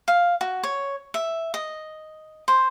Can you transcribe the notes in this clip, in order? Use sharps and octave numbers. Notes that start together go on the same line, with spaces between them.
F5
F#4
C#5
E5
D#5
C5